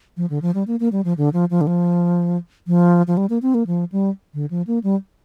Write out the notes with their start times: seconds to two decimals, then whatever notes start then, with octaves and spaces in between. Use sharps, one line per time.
0.17 F3
0.30 D3
0.42 F3
0.55 G3
0.67 A#3
0.80 A#3
0.92 G3
1.05 F3
1.18 D3
1.33 F3
1.50 F3
1.61 D3
1.67 F3
2.67 F3
3.08 F3
3.17 G3
3.30 A#3
3.42 C4
3.54 A#3
3.67 F3
3.92 G3
4.34 D3
4.50 F3
4.67 A#3
4.84 G3